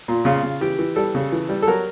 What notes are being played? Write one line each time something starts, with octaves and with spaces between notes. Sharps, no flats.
A#2
C#3 F4
C#3
E3 G4
E3
G3 A4
C#3
E3
G3
A4
F#3 A#4